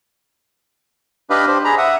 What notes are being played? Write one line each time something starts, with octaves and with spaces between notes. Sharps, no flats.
D4 G4 B4 D#5 F5 B5
D4 G4 C5
G#4 A#5 B5
E5 F#5 D#6